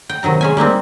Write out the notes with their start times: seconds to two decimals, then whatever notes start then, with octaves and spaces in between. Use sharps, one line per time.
0.09 G5
0.23 C3 D#3 F#3 A#5
0.41 G#3 C#4 G#5
0.57 G3 A#3 C4 D#4